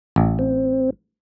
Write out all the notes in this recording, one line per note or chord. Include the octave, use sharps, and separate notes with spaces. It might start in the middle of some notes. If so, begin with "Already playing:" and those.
A1
C4